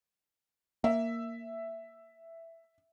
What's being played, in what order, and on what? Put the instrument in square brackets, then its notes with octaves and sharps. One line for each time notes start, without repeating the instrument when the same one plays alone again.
[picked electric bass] A#3 [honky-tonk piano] E5